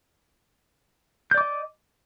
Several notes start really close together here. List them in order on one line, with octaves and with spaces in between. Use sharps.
G6 D5 D6 D#5